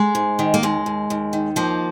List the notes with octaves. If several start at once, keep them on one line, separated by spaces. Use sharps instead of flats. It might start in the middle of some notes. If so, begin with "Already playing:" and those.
Already playing: G#3
G#2
D#3
A#3
D#2 G#3
D#2
D#2
D#3
D#2 F3 A#3